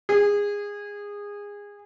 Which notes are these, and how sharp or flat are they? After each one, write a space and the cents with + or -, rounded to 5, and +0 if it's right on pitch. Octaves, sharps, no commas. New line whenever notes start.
G#4 -20